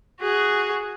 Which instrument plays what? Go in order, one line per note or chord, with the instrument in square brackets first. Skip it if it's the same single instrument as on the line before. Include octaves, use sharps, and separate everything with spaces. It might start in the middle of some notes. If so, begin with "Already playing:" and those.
[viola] F#4 G#4